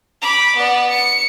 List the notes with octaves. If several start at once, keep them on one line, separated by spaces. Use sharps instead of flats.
B5 D6
B3 D5
C#7